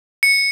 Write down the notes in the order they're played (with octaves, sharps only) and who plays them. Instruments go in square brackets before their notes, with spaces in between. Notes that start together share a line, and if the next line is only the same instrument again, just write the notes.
[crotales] C#7